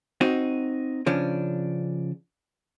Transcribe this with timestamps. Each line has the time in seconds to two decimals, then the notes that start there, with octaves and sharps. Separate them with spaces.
0.21 C4 D#4 F#4
1.06 C#3 F3 C#4 D4